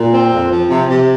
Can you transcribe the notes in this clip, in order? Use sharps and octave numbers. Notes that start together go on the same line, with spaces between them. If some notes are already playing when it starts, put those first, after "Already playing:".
Already playing: A#2
C4
F2
F3
C3
C3